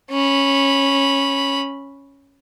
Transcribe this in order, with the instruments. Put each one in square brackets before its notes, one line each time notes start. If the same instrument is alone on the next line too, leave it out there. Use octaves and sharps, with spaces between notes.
[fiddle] C#4 B5